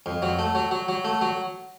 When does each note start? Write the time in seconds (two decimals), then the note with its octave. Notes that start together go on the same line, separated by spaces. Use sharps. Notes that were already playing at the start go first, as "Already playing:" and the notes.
0.06 F2
0.22 F#3
0.39 A3
0.55 F#3
0.71 F#3
0.88 F#3
1.05 A3
1.21 F#3